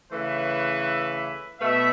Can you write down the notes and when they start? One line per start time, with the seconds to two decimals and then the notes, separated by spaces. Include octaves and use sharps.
0.11 C#3 E3 A3 B4 E5
1.60 B2 A3 B4 E5